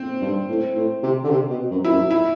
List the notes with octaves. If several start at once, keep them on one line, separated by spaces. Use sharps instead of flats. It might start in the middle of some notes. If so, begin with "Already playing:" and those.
Already playing: C4
G2
A2
A2
C3
D3
C3
B2
F#2
E4
F#2
E4